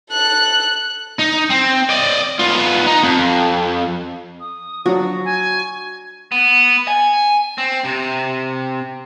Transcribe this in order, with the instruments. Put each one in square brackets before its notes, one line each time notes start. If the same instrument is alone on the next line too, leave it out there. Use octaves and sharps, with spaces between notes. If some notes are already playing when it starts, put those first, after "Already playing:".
[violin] A4 F#6
[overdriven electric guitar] D#4
C4
D5 D#5
B3 F4
D#4
F2
[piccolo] D#6
[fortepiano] F3 F#3 D4 [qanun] F#4
[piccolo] G#5
[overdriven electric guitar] B3
G#5
C4
C3